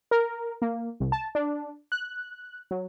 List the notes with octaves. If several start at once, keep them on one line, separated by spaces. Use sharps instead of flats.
A#4
A#3
C2
A5
D4
F#6
F#3